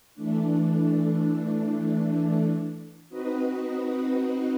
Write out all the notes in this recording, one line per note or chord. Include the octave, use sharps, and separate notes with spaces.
E3 A3 D4
C4 D#4 F#4 B4 D#5